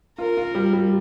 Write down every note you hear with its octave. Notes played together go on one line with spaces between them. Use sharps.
F4 A#4
F4
G3
G3